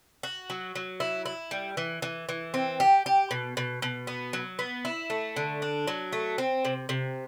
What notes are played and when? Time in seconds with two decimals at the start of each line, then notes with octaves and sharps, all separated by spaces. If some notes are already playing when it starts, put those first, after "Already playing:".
0.23 F#4
0.50 F#3
0.75 F#3
1.00 E4
1.26 E4
1.51 G3
1.77 E3
2.02 E3
2.29 E3
2.54 C4
2.80 G4
3.06 G4
3.31 B2
3.57 B2
3.82 B2
4.07 B3
4.33 F#3
4.59 B3
4.85 E4
5.10 A3
5.36 D3
5.62 D4
5.87 F#3
6.12 A3
6.38 C4
6.65 C3
6.89 C3